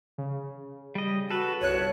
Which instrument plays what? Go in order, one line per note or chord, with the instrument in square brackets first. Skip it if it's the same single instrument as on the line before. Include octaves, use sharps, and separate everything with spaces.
[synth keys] C#3
[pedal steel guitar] G3 D#5
[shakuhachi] F#4 [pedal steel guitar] A4 B4
[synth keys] G1 C2 F#6 [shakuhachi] C#5